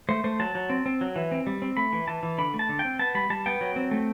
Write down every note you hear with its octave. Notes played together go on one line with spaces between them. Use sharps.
A3 C5
A3 C5
F#3 A5
F#3
C4
C4
F#3
E3
C4
G3
C4
A3 B5
E3
E3 A5
E3
D3 B5
A3
A5
D3
G5
C4
B3 A5
G3 B5
G3 A5
B3 G5
F#3
C4
A3